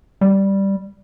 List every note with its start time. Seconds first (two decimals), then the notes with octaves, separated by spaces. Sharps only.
0.21 G3